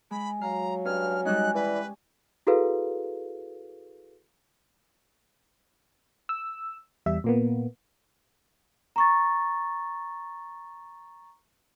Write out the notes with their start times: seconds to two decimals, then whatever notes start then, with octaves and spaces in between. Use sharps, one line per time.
0.11 G#3 B5
0.41 F#3 F5 A#5
0.85 G2 C#4 F6
1.25 G3 G#3 C#4 D#4 F#6
1.54 E3 B4 D5
2.47 E4 F#4 G#4 A4 B4 F5
6.29 E6
7.06 E2 G3 E5
7.24 A#2 A#3 B3
8.96 A#5 C#6 A6